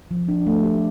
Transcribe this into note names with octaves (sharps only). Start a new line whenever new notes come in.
F3
D4
A3
G4